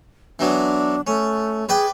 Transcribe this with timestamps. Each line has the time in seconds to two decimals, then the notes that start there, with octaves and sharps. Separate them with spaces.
0.39 E3 F#3 B3 D4
1.07 A3 C#4
1.69 G#4 B4 D5 G5